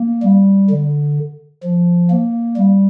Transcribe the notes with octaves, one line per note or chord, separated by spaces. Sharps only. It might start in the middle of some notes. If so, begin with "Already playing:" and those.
Already playing: A#3
G3
D3
F3
A#3
G3